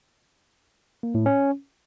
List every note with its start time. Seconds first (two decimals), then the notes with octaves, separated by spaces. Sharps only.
1.03 A#3
1.15 A2
1.26 C#4